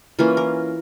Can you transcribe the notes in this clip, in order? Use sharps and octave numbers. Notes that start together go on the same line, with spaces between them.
E3 A#3 C#4 F4
A#4